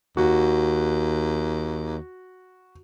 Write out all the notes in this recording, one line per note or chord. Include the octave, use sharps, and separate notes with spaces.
D#2 F#4